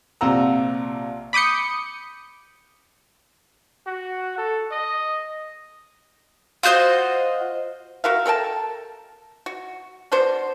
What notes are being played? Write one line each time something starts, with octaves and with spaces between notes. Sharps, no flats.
A#1 C3 F4 F#5 A#5 E6
B5 D6 D#6 G6 C#7
F#4
A4
D#5
F4 F#4 C5 D#5
F#4 A#4 E5 F5
A4 A#4 G5 A5
F#4
B3 D4 F#4 C5